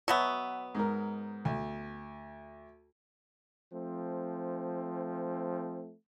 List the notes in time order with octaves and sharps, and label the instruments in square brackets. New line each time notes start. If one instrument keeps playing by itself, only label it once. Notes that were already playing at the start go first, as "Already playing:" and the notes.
[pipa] B2 F#3 B3 [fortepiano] E5
[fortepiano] G#2 A#4
D2
[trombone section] F3 A3 C4